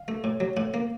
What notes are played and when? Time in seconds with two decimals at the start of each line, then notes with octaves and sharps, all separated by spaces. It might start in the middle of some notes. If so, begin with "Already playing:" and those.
Already playing: F5
0.08 A3
0.24 A2
0.40 F#3
0.57 A2 F#5
0.74 A#3